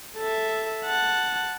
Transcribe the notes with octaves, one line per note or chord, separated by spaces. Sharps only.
A4 E5
F#5 A5